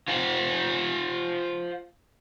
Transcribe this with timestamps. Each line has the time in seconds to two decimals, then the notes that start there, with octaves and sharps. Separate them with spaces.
0.08 F4 C5 F5 F#5